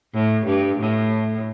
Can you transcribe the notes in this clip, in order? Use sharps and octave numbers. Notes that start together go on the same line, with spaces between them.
A2
G2
A2